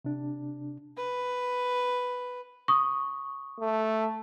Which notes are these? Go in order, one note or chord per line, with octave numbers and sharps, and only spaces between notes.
C3 D4
B4
C#6 D#6
A3